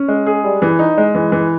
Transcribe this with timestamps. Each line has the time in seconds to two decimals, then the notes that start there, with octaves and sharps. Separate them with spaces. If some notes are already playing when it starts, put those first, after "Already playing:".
Already playing: C#4
0.08 G#3
0.26 G#4
0.44 G3
0.62 E3
0.79 D#4
0.98 G#3
1.15 E3
1.32 E3